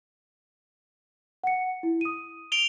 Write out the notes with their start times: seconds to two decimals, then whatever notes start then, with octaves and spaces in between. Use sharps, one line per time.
1.44 F#5 C#7
1.83 E4
2.01 D#6 D#7
2.52 D7 F7 G7